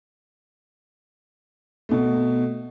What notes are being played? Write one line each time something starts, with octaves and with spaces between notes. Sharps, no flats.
B2 A3